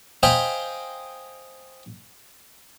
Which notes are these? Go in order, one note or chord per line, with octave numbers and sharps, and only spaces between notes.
C5 D#5 F5 G5 G#5 B5